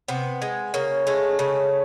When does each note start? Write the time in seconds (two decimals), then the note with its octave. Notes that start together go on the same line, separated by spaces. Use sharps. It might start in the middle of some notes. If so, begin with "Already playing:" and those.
0.08 C3 B3
0.42 G#3
0.74 C#3 A#3
1.07 G#3 A3
1.39 C#3